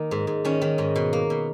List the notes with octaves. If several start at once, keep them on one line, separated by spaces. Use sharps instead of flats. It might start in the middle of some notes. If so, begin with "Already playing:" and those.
Already playing: D#3 A#3 D#4
G#2
G#2
D#3 C#4
D#3
G#2
B2
A#3
B2